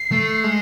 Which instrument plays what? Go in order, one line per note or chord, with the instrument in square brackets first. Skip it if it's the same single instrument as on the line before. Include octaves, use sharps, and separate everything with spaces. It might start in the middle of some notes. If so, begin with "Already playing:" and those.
Already playing: [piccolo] C7
[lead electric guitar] A3
G#3